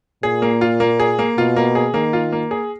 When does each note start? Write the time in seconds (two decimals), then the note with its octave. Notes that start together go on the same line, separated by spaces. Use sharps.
0.23 A#2 G#4
0.42 A#3
0.61 F4
0.80 A#3
1.00 G#4
1.19 A#3
1.38 B2 F4
1.56 A#3
1.75 G#4
1.94 D#3 A#3
2.13 F4
2.32 A#3
2.51 G#4